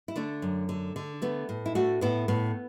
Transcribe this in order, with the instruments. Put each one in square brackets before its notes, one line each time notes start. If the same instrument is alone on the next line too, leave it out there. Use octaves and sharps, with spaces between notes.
[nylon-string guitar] E4
D3 A3 D4
F#2
D3
D3
A3 B3
A2
E4
A3 D4 F#4
A2 B3 E4
A2 B3